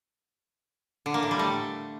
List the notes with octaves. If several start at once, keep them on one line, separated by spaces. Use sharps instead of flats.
D3
A#3
A2
G3
A3